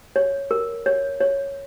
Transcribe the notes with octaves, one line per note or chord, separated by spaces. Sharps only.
C#5
A#4
C#5
C#5